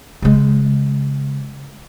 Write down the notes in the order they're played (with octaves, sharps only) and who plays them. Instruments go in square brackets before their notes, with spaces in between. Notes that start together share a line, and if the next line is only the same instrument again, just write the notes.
[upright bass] C#3 G#3